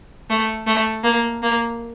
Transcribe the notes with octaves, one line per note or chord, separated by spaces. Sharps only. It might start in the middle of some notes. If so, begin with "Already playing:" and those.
A3
A3
A#3
A#3